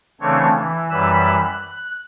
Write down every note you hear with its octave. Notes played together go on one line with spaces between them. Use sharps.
C#3 E3 A3 C4 D4 C#5
E3
F#2 E3 G3 B4 B5 E6
F#6